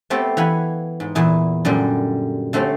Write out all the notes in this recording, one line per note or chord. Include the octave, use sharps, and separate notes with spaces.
A3 B3 C4 G4 A4
E3 F5 F#5 G#5 B5
G#2
E2 A#2 E4 G#4
F#2 A#2 D3 G3
D3 A3 C4 C#4 G4